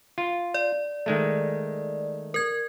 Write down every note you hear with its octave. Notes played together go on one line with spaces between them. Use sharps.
F4
D5
D#3 G#3 A3
A#4 G#6